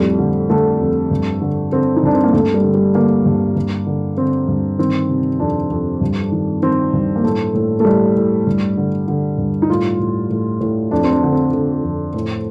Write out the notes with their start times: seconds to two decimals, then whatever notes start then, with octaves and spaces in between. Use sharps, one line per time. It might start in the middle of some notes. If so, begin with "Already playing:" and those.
Already playing: F2 A2 G3
0.19 D3
0.50 D3 A3
0.81 F2
1.11 G2
1.42 D3
1.72 D3 C4
1.96 D#4
2.03 G2 D4
2.15 C4
2.24 A#3
2.33 G2 A3
2.54 G3
2.64 D3
2.74 G3
2.95 D3 A#3
3.25 G2
3.56 G2
3.87 D3
4.17 D3 C4
4.48 G2
4.79 D#3 C4
5.09 C3
5.40 F2 D4
5.71 F2
6.01 G2
6.32 D#3
6.62 D#3 C4
6.93 G2
7.16 A#3
7.24 A2 A3
7.54 A2
7.80 A3
7.85 A2 G3
8.16 A2
8.47 G2
8.77 D3
9.08 D3
9.38 G2
9.62 D#4
9.70 A2 F4
9.99 A2
10.30 A2
10.61 A2
10.91 F2 D4
11.04 C4
11.12 D4
11.23 D3
11.32 C4
11.53 D3
11.83 F2
12.14 A2